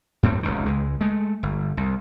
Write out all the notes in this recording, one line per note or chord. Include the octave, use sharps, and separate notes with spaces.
F#2 A2 C4
F1 C#2 D#3
C#2 G#3
G#3 A3
G1
C2